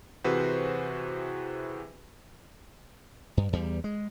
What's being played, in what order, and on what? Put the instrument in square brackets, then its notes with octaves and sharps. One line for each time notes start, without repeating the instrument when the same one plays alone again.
[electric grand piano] C3 E3 F#4 G#4 B4 C5
[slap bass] G2
E2 G3
G#3